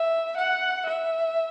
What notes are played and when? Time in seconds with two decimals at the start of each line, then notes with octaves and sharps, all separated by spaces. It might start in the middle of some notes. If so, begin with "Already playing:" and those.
Already playing: E5
0.37 F#5
0.87 E5